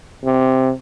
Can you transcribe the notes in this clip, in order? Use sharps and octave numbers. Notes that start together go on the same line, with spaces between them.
C3